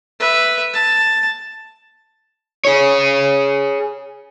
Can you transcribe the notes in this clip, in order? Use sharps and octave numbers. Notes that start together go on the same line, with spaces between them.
B4 E5
A5
G#4 C#5